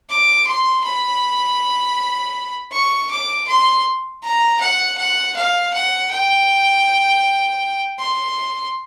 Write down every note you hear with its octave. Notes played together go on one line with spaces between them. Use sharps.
D6
C6
B5
C#6
D6
C6
A#5
F#5
F#5
F5
F#5
G5
C6